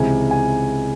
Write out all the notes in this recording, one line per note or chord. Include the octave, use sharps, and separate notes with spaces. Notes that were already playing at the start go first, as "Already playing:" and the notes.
Already playing: C#2 C3 E3 G#5
G#5